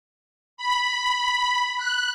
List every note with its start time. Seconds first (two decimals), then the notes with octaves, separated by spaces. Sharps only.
0.57 B5
1.78 F#6